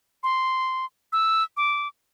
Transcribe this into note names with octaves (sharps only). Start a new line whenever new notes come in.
C6
E6
D6